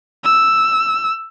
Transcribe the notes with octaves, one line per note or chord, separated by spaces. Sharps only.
E6